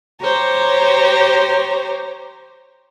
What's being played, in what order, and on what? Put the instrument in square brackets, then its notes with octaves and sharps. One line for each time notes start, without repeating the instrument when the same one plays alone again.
[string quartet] G4 C5 C#5 A#5